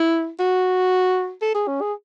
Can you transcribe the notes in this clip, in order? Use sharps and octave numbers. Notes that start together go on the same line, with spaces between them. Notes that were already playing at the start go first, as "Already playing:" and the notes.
Already playing: E4
F#4
A4
G#4
C#4
G#4